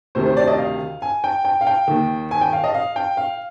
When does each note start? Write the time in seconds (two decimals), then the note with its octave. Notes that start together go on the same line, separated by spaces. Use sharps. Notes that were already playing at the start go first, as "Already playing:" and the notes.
0.15 D2 C3 D#3 C5
0.26 C5
0.37 D5
0.48 D#5
0.58 F5
1.02 G#5
1.24 G5
1.45 G5
1.61 F5
1.67 G5
1.88 D#2 D#3
2.31 G#5
2.41 G5
2.53 F5
2.64 D#5
2.74 F5
2.96 G5
3.17 F5